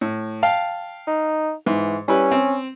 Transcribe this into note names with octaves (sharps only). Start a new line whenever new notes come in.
A2
F5 G5 A5
D#4
G#2 E3
G3 C#4 E4 B4
C4